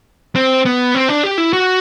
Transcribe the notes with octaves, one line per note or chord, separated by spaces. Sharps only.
C4
B3
C4
D4
G4
E4
F#4